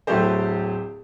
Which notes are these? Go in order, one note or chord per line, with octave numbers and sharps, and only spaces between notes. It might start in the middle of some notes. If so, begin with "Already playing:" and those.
D1 F#3 A3 E4 G4 C5